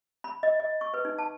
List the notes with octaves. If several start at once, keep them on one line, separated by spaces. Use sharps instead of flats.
B5
D#5
D#5
C#6
B4
D#4
A5